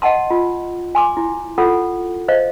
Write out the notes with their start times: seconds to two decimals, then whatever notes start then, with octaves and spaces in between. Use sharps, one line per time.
0.02 D#5 F#5 A5 C6
0.31 F4
0.95 G#5 C6 D6
1.17 E4
1.58 F4 A4 F#5
2.28 C5 D#5 F5